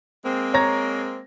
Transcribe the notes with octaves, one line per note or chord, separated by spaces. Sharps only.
G#3 A#3 C4
C#5 A#5 A#6